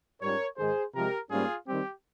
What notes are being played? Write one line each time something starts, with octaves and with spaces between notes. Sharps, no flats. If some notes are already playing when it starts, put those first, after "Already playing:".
G#2 G3 C#4 F4 A#4 C#5
G#2 D#3 G#3 G#4 C5
C3 F3 G#3 G4 A#4
G#2 G3 A#3 C#4 F4 G#4
D#3 G3 C4 G4